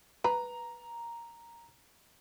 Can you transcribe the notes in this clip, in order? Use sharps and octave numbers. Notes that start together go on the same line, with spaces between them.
B4 A#5